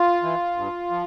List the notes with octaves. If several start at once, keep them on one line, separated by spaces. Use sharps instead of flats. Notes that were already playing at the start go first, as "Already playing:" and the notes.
Already playing: F4
E3
G2
F3